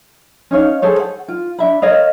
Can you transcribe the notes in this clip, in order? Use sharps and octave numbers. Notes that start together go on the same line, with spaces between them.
C#4 D#4 C#5 F5
G#4 A4 C5 C#5
F#5
F4
D4 E5 B5
A#4 C#5 D#5 F5